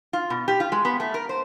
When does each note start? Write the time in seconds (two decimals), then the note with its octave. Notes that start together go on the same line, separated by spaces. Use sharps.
0.13 F4
0.30 B2
0.48 G4
0.60 F4
0.72 G#3
0.85 B3
1.00 A3
1.14 A#4
1.29 C5